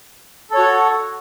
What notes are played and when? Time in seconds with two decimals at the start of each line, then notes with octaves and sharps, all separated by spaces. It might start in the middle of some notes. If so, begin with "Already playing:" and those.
0.51 A4
0.54 C#5
0.58 F#4